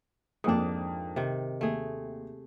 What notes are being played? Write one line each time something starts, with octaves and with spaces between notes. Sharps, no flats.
F2 G#2 A#3 D4 D#6
C3 D#3
D#2 A3 G#4